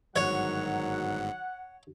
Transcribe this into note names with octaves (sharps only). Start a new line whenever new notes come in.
G1 G#2 D#3 F#3 C#5 F#5